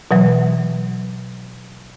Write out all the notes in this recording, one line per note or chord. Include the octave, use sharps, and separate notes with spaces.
B2 E3 F#3